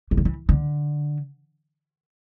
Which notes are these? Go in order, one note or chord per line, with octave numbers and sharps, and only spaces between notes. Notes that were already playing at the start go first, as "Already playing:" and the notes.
E3
D3
E3
D3